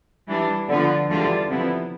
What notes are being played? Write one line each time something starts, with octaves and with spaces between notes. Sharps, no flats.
E3 G3 D4
D3 F3 B3 F4
E2 D3 G3 D4 F4
C3 F3 B3 E4